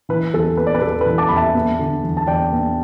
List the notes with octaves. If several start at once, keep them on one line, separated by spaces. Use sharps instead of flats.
E3 B4
E2 A4
B3 B4
D5
B4
E1 A4
B4
E3
A5 D6
E2 B5
E5 A5
B3
D3
E2
A5
E2 D5 G5
B3